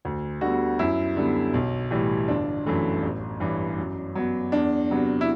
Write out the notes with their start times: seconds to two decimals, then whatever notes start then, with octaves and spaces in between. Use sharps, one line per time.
0.05 D2
0.41 D3 G3 B3 F#4
0.79 F#2 E4
1.17 D3 G3 B3
1.54 B1
1.91 A2 E3 G3
2.28 G1 D4
2.66 F#2 E3 A3
3.03 A1
3.40 G2 E3
3.78 F#2
4.15 F#3 B3
4.52 E2 D4
4.90 C3 F#3 B3
5.21 E4